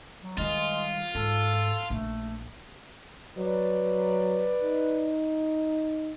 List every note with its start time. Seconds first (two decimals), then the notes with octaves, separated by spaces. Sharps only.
0.22 F#3
0.38 D#3 G3 G#3 F4
1.15 G#2 A4
1.90 A#1 A3
3.38 F#3 B4 D5
4.63 D#4